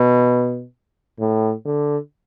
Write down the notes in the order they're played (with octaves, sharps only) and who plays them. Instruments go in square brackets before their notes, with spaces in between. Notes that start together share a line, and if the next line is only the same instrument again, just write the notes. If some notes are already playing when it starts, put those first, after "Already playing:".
Already playing: [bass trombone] B2
A2
D3